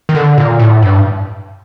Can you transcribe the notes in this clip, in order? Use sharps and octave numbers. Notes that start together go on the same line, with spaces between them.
D#3
D3
A#2
A2
G2